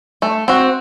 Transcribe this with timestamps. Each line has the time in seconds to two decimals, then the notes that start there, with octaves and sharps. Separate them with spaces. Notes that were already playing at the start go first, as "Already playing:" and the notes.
0.22 A3
0.48 C4 F#4